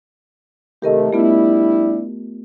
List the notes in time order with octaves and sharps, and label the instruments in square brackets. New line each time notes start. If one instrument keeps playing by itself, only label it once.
[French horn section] C3 D#3 A3 [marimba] G4 A#4 D#5
[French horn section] G3 D4 E4 [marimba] A3 B3 F4